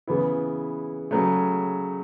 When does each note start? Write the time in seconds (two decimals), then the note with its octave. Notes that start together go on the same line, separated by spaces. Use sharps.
0.07 C#3 E3 B3 E4
1.11 C#3 F#3 A3